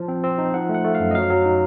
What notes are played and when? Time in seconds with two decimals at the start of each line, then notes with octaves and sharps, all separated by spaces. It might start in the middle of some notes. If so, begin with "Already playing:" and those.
Already playing: F3 A5
0.08 C4
0.24 C4
0.38 D#4
0.54 F3 F#5
0.69 A3
0.74 F#5
0.84 A3
0.95 F5
1.00 F#2
1.11 D#5
1.15 F#3 F5
1.30 F#3
1.45 D#4